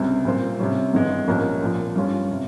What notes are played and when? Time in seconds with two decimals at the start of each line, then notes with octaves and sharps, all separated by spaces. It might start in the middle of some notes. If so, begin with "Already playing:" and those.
Already playing: C#2 C3 G3 C4
0.25 A#2 G3 C4 F4 C5
0.60 C3 G3 C#4
0.93 G#1 G2 E3 G#3
1.27 C2 A#2 F3 A#3 C#4
1.61 A#1 A#2 F3
1.96 G2 G3 C#4 F4
2.31 C3